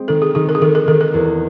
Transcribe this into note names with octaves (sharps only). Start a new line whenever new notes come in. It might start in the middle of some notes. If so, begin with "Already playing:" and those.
Already playing: G#3 C4
D#3 A4
G#4
D#3 G#4
A#4
G#4
D#3 A4
A#4
D#3 A4
A#4
E2